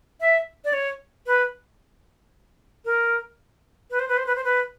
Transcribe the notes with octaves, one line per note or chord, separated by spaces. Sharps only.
E5
D5
C#5
B4
A#4
B4
C5
B4
C5
B4
C5
B4